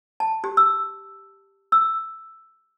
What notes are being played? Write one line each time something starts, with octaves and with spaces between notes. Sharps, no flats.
A5
G4
E6
E6